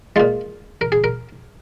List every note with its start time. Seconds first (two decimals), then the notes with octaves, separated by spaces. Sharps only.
0.16 A#2 G#3 F4
0.81 A#4
0.92 G#4
1.04 A#4